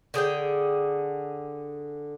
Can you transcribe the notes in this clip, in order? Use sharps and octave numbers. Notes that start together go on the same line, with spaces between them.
D3 G#4 B4 G5